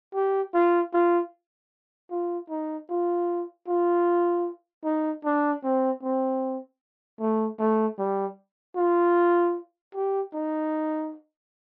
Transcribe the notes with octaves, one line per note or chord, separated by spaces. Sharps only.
G4
F4
F4
F4
D#4
F4
F4
D#4
D4
C4
C4
A3
A3
G3
F4
G4
D#4